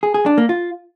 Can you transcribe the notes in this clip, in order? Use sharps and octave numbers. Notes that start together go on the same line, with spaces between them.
G#4
G#4
D4
A#3
F4